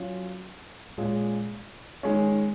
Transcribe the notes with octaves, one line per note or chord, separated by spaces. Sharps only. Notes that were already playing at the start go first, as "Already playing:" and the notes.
Already playing: F#3 C#4 F4
A#2 G#3 C#4 G#4
D#3 G#3 C#4